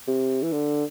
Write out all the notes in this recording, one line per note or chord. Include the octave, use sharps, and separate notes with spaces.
C3
E3
D3